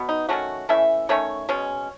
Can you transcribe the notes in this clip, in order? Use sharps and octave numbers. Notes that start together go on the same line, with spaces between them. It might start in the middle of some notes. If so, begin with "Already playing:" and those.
Already playing: B2 F#3 B3
D#4
D#3 F#3 A3 C#4 F#4
E3 A3 C#4 E5
D#3 A3 C#4 C#5
B2 G#3 C#4